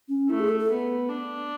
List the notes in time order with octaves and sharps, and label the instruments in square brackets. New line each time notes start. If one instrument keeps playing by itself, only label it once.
[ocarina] C#4
[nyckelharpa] A3 [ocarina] E4
[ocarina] G#4
A4
A4
[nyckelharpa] B3
D4